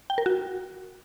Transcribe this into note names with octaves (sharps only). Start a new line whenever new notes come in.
G5
A#4
F#4